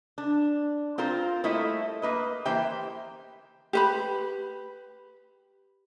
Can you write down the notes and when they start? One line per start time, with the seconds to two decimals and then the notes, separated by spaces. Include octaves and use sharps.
0.18 D4
0.98 C4 F4 A#4 C5
1.44 G3 A3 A#3 E4 A4 D#5
2.02 A#3 B4 D#5
2.45 E3 A#3 G4 C5 E5 G5
3.73 G4 B4 B5